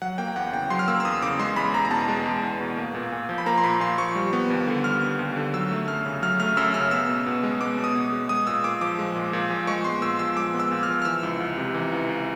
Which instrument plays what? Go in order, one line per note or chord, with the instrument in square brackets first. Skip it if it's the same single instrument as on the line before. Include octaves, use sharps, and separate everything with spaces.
[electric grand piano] F#3 F#5
A#3 G5
G5
E2 F#5
C#3 G5
F#3 C6
F6
A#3 E6
E6
E2 D#6
C#3 D6
G#3 C6
E2 B5
E2 A#5
A#5
B2 A5
G#3
E2
E2
B2
A#3
A#2
A#2
F3
B5
A#3 A#5
C6
A#2 B5
A#2 C6
F3 C#6
G3
B3
D#2
D3
G3 F6
B3
D#2
D3
F#3 E6
A3
F#2 F6
C#3
F#3 F6
A3 F6
F#2 E6
C#3 F6
B3 E6
B2
B2
G#3
B3 D6
B2
D#6
B2
G#3
G#3 D#6
A#2 E6
A#2 D6
F3 D6
G#3
A#2
A#2
F3
G#3 C#6
B3 C6
A#2 E6
F3 E6
G#3 D6
B3
E6
A#2
F6
F3
F6
E3 E6
C#2
C#2
C3
E3
C#2
C#2